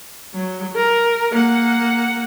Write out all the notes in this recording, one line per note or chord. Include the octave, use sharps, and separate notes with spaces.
F#3
A#4
A#3 F#5